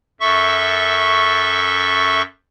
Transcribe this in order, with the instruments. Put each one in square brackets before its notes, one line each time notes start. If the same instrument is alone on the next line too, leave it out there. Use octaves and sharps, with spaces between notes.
[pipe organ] F#2 A4 E5 C#6